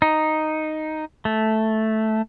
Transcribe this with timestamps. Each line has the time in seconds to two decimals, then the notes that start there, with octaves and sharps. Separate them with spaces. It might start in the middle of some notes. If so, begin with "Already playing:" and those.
0.02 D#4
1.25 A3